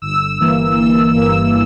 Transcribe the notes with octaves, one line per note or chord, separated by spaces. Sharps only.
G1 E6
G2 E3 A#3
G1 E6
G2 E3 A#3 E6